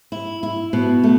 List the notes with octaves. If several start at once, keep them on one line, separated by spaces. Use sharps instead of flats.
E4
E4
B2
A3